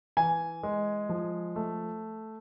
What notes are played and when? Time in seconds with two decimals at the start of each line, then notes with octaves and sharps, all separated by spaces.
0.17 E3 G#5
0.63 G#3
1.09 F3
1.56 A3